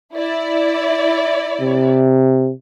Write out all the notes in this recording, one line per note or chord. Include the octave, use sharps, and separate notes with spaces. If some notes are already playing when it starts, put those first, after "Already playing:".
E4 D5
C3